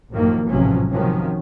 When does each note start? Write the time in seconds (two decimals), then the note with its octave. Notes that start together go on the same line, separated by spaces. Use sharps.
0.11 A1 F#2 D#3 F3 A#3
0.49 A1 G#2 C3 F3 F#3 C#4
0.91 C3 D#3 F3 F#3 C#4